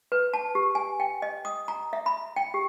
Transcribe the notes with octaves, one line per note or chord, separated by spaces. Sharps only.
B4
A5
G4
G#5
G5
D#5
D#6
A#5
E5
B5
G5
G4